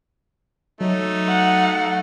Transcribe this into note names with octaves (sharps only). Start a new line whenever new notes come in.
F#3 A3 D#4
F#5